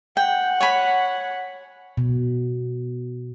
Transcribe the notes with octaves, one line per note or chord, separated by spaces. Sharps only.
F#5 G5
C#5 G#5 B5
B2